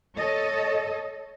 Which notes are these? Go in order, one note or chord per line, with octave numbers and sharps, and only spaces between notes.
A4 C#5 D#5